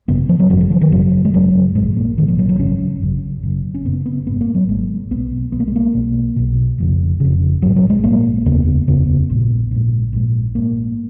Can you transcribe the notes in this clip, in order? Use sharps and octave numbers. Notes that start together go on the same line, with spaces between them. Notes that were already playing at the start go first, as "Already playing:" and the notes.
G#1 F#2 C#3 B3
F3
F#3
G#1 F#2 C#3 F#3
F#3
F3
D#3
G#1 F#2 C#3 F#3
G#3
G#1 F#2 C#3 F#3
A#1 G#2 G#3
A#3
A#1 G#2 D#3
F3
F#3
F#3
G#1 F#2 C#3 C#4
G#1 F#2 C#3
F#1 F#2 C#3
C#4
F#1 F#2 C#3 B3
B3
G#1 G#2 B3
A#3
F#3
G#1 G#2 G#3
B1 B2 B3
B1 B2 B3
A#3
G#3
A#3
B1 B2
B1 B2
F1 F2 C#3
F1 F2 C#3
A#1 G#2 F#3
F#3
G#3
A#1 G#2 A#3
F1 D#2 C#3 B3
F1 D#2 C#3 B3
A#1 G#2
A#1 G#2
A#1 G#2
A#1 G#2 A#3